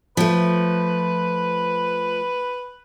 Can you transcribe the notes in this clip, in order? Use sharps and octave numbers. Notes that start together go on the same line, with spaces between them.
F3 A3 B4